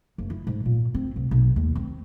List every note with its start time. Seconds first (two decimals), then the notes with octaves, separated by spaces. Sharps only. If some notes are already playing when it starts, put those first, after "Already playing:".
0.18 F#1
0.30 E4
0.47 G#2
0.66 A#2
0.95 C4
1.16 C2
1.31 B1
1.56 D#2
1.75 C4